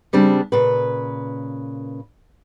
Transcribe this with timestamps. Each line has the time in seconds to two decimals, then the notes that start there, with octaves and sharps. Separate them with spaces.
0.13 C#3 G3 C4 D4
0.52 A#2 C#3 B4